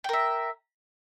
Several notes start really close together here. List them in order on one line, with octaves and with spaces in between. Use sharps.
G5 A#4 E5